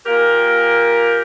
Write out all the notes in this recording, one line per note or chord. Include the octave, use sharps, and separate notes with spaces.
A#2 A#3 G4 A#4